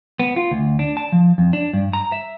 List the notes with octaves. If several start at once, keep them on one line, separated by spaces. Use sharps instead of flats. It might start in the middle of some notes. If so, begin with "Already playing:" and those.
B3
F4
D2
D4
A5
F3
F2
D4
G2
A#5
E5